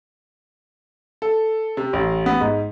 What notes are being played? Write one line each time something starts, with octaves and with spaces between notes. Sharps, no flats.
A4
C3
A1
B3
G#2